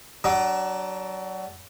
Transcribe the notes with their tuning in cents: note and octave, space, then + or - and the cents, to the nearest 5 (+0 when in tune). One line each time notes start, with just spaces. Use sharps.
F#3 +25 D4 +0